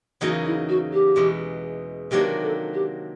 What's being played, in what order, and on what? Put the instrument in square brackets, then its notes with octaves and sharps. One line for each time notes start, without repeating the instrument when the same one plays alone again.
[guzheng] E2 C#3 F#3 A#3 D#4 [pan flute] F#4
[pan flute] E4
F#4
G4
[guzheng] E2 B2 G#3
[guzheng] C3 D#3 F#3 A#3 D4 [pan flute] G4
[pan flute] A4
G4